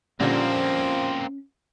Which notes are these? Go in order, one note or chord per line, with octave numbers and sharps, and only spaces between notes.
A#2 D3 F3 G3 A#3 C4 C#4